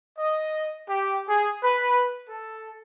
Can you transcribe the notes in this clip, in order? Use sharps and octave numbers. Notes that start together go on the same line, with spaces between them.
D#5
G4
G#4
B4
A4